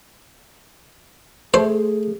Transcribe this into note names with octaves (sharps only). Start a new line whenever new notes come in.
A3 G#4 C5